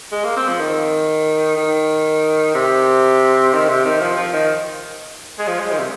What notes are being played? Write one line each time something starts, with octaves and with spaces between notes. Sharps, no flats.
G#3
A#3
C4
F3
D#3
D#3
C3
D#3
C3
D#3
F3
F3
D#3
G#3
F3
G#3
D#3
C3